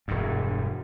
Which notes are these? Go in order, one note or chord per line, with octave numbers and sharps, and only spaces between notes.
E1 G2